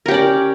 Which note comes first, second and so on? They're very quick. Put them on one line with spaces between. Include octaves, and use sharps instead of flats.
A#4 G4 C#4 D5